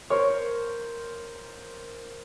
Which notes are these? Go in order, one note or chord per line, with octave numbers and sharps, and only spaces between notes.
A#4 C5 C#5